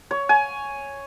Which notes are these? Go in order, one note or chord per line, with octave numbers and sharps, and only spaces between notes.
C#5
G#5